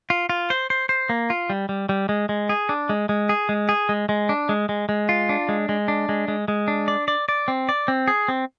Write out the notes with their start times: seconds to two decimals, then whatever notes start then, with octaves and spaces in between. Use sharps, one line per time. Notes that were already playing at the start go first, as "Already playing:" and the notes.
0.10 F4
0.29 F4
0.50 C5
0.70 C5
0.89 C5
1.09 A#3
1.30 F4
1.50 G3
1.69 G3
1.89 G3
2.09 G#3
2.29 G#3
2.49 G#4
2.69 D4
2.89 G#3
3.09 G#3
3.29 G#4
3.49 G#3
3.69 G#4
3.89 G#3
4.09 G#3
4.29 D4
4.49 G#3
4.69 G#3
4.89 G#3
5.09 F4
5.29 D4
5.49 G#3
5.69 G#3
5.88 D4
6.09 G#3
6.28 G#3
6.48 G#3
6.68 D4
6.88 D5
7.08 D5
7.29 D5
7.48 C4
7.69 D5
7.88 C4
8.08 G#4
8.28 C4